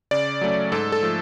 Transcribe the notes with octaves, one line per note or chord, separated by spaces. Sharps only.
C#3 D5
F#3 A3 C#4
G#2 A4
A4
F3 A3